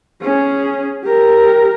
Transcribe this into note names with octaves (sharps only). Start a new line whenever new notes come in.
C#4 G#4
G4 A#4